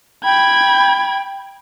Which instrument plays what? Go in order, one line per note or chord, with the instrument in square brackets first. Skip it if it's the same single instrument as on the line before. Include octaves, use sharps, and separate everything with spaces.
[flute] G5 [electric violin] B5 G#6